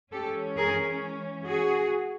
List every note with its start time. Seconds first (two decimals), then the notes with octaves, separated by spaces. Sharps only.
0.13 E3 G#3 C#4 G4 A4
0.57 G#4 A#4
1.44 F#4 G#4